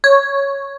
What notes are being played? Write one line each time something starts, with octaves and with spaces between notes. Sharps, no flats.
C#5